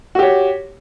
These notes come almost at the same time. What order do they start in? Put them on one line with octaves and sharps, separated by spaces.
F#4 G4 C#5